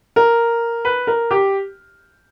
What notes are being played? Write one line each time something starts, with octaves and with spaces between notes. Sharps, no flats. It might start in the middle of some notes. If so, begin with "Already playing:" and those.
A#4
B4
A#4
G4